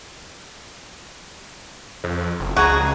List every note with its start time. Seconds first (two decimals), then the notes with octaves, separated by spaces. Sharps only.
2.04 F2
2.40 F#1
2.56 C#2 F#3 F#4 G#4 A#5